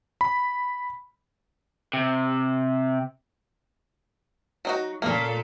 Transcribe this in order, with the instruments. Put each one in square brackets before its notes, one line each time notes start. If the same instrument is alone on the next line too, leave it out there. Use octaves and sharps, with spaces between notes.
[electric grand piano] B5
[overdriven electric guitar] C3
[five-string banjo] F#3 D#4 F#4
[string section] A#2 A4 [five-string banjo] A#3 C#4